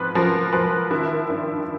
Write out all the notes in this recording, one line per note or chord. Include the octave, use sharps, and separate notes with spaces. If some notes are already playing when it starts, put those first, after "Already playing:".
Already playing: G#2 F3 C4 B4
F3 A#4
F3 B4
D#3 E4 E5
G2